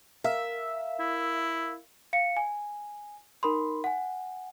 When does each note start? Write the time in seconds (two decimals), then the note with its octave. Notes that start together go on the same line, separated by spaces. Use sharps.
0.24 A#4 E5 F5 E6
1.00 E4
2.13 F5 C#7
2.37 G#5
3.43 D#4 A#4 B5 C6
3.84 F#5 G#5